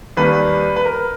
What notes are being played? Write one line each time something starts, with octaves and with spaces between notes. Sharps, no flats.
D#2 D#3 G3 A#3 B4
B4
A#4